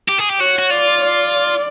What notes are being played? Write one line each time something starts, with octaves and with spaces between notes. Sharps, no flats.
G4
G#4
G4
F#4 C#5
F#4
F4 D5
D5